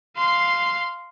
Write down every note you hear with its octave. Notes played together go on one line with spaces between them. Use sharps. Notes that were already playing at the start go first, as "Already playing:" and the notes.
F5 C6